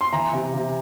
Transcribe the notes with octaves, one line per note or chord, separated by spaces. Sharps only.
C6
E3 A#5
C3
C3